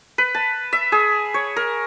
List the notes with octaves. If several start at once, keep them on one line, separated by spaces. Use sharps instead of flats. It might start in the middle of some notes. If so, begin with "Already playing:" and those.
B4
A5
E5
G#4
C#5
A#4